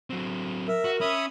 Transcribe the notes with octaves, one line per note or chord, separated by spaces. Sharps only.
F#3 C4
A#4 E5
F#4
C#4 E5 B5 D#6